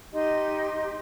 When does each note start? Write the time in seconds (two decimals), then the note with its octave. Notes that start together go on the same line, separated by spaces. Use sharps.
0.13 D#4 G4 D#5 C6